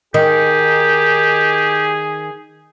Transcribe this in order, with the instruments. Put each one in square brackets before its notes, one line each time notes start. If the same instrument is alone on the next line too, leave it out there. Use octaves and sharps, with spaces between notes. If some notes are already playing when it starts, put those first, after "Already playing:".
[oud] D#3 [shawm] G4 [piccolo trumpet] G#4